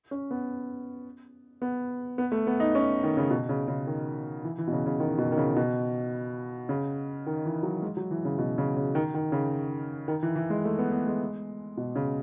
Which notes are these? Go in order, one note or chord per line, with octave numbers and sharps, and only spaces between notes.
C#4
B3
B3
B3
A3
B3
D#4
C#4
D#3
C#3
B2
C#3
C#3
D#3
E3
E3
B2
C#3
C#3
D#3
B2
D#3
C#3
B2
C#3
D#3
E3
F#3
G#3
F#3
E3
C#3
B2
C#3
C#3
D#3
D#3
C#3
D#3
E3
E3
G#3
A3
B3
B3
G#3
B2
C#3